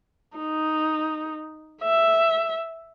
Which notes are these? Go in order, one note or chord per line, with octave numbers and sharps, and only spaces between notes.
D#4
E5